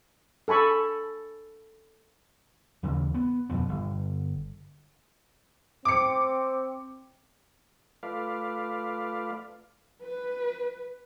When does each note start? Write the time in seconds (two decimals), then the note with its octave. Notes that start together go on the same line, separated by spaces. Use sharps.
0.48 A4 G#5 B5 C#6
2.83 D#2 C#3 E3
3.14 B3
3.50 F2 B2 B3
3.69 G1
5.85 C4 D6 C#7
8.03 A3 F4 B4 D5 F5
10.02 B4